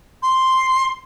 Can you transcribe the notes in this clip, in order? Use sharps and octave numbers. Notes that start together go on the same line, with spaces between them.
C6